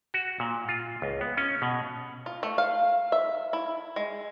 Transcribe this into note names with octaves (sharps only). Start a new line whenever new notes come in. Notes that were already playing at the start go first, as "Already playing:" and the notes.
F#4
A#2
F4
C#2
B3
C#4
B2
F4
A3
F5
E5
E4
G#3